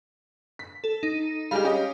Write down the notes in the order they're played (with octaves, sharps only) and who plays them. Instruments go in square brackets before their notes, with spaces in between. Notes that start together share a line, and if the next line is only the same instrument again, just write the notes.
[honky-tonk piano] B6
[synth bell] A4
D#4
[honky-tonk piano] G3 G#3 G4 [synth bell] F5
[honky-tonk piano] C#4 G4 D#5